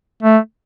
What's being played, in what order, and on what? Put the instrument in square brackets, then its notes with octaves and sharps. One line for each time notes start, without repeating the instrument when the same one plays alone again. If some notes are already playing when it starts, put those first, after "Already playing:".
[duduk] A3